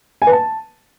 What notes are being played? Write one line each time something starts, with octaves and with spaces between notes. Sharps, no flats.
G#5
B4
A5